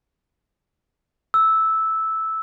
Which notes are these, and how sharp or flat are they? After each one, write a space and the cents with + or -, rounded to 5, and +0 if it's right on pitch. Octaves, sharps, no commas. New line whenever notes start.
E6 -10